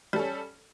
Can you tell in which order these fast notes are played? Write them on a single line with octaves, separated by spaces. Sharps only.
G3 A4 C#4